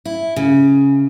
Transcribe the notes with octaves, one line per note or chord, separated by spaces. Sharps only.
E4
C#3